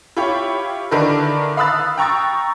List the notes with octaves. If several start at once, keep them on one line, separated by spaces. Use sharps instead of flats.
E4 F4 G4 C#5
D3 D#3 D4 E4 A#4 B4
F5 B5 D#6 E6 F#6 A6
G5 A#5 C#6 E6 A6